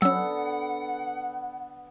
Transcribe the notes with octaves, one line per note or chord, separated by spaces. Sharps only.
D3 F#3 B3 C#4 F#5 E6